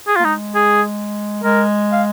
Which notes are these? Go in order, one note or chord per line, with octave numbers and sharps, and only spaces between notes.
G#4
A#3 F4
G#3 D#4
G#4
G#3 A#4
F5